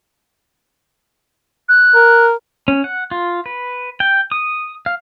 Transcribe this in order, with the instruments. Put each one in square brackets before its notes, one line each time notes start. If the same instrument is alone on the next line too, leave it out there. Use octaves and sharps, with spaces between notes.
[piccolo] F#6
[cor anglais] A#4
[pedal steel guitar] C#4
F#5
F4
B4
G5
D#6
F5